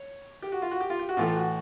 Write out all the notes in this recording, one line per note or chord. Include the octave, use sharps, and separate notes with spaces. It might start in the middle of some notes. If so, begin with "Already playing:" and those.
Already playing: C#5
G4
F#4
F4
F#4
G4
F4
G4
F#4
A2 E3 A3 F4
F#4